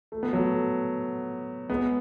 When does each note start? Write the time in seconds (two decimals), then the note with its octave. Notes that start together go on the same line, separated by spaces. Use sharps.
0.12 A3
0.23 B3
0.33 F#3 A3
1.69 G#3 B3